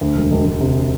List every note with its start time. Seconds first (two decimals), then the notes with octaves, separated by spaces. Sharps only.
0.01 D2
0.16 E1
0.31 E1
0.45 E1
0.60 C3